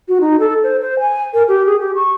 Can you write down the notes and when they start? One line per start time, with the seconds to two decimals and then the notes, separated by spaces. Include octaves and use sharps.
0.08 F#4
0.21 D#4
0.40 A4
0.63 C5
0.80 C5
1.00 G#5
1.34 A#4
1.48 G4
1.66 G#4
1.80 G4
1.95 C#6